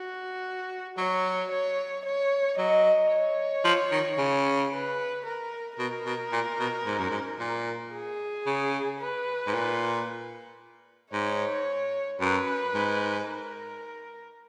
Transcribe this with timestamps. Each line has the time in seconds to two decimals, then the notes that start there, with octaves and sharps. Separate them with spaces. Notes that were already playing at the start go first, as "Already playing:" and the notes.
Already playing: F#4
0.98 F#3 C#5
1.51 C#5
2.05 C#5
2.58 F#3 D#5
3.12 C#5
3.65 F3
3.92 D#3
4.18 C#3
4.72 B4
5.26 A#4
5.79 B2 A#4
6.06 B2
6.32 A#2
6.59 B2
6.86 G#2
6.98 F#2
7.10 G#2
7.40 A#2
7.93 G#4
8.46 C#3
9.00 B4
9.47 G#2
9.54 A#2
11.13 G#2 C#5
12.20 F#2 B4
12.74 G#2
13.27 A#4